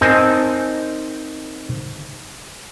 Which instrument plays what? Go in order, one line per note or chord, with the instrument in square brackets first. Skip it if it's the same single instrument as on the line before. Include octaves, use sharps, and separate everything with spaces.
[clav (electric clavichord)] C4 D#4 A#4 C5 G#5 A5